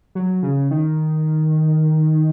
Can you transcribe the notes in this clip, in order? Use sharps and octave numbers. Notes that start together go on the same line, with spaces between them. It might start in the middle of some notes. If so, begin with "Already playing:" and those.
F#3
C#3
D#3